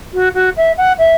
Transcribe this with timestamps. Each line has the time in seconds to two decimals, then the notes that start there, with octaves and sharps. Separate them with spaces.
0.13 F#4
0.34 F#4
0.56 E5
0.77 F#5
0.98 E5